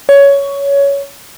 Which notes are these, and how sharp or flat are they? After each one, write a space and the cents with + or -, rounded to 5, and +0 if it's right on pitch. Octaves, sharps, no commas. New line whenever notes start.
C#5 +15